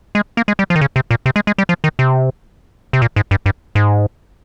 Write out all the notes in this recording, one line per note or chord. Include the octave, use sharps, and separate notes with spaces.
G#3
A#3
G#3
G3
F3
D#3
C#3
C3
A#2
C3
G#3
G#3
G3
F3
D#3
C3
C3
A#2
G#2
G2
G2
G#2